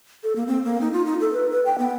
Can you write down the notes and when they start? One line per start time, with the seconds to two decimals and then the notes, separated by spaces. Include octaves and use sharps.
0.24 A4
0.36 A#3
0.47 C4
0.64 A#3
0.81 D#4
0.93 F4
1.06 D#4
1.21 A4
1.33 B4
1.50 B4
1.66 G5
1.78 B3